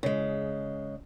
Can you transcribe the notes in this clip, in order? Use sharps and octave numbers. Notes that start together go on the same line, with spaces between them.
C#3 G#3